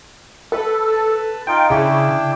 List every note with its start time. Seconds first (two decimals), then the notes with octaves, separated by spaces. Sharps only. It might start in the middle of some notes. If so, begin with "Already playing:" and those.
0.52 A4 B4
0.87 B4 A5
1.47 D#4 F4 G5
1.70 C#3 D4 E4 G5